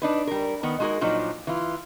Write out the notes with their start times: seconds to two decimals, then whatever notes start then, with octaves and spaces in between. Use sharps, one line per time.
0.02 D4 D#4 B4
0.27 G3 A#4
0.63 D#3 B3
0.80 G#3 D#4 F#4 G#4 A#4
1.01 A#2 F3 F#3 D4 D#4
1.47 E3 F4